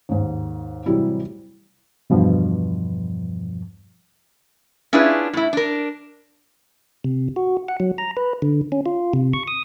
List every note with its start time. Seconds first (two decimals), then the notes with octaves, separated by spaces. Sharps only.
0.09 D#2 G#2
0.86 A2 C3 E3 F#3 G3 E4
2.10 E2 G2 B2 F3
4.93 C#4 D4 E4 F4 G#4 B4
5.33 A2 E4
5.53 D4 A#4
7.04 C3
7.36 F#4
7.68 F#5
7.80 F#3
7.98 A#5
8.17 B4
8.42 D3
8.72 C#4
8.86 F4
9.13 C3
9.33 C#6
9.48 D#6